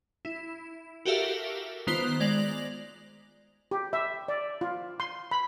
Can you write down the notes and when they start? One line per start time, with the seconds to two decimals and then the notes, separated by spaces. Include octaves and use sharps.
0.25 E4
1.05 F#4 G4 A4 A#4 E5 F5
1.87 D#3 B3 F4 C5 F#6
2.20 G#3 D5 A#6 F7 F#7
3.71 G4
3.93 E5
4.28 D5
4.61 F4
5.00 C6
5.31 B5